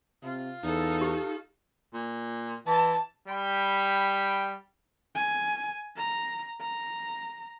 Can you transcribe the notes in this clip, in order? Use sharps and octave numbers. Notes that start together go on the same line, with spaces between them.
C3 F4
E2 D#4 A4
G4
A#2
E3 A5
G3 G5 B5
G#5
A#5
A#5